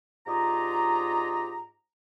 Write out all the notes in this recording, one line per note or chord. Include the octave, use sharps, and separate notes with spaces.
G#2 D4 F4 G4 D#5 A#5